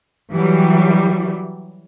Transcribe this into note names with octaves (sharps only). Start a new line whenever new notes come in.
E3 F#3 G3